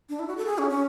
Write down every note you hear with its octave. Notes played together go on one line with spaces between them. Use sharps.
D4
E4
F#4
A4
G#4
C#4
C#4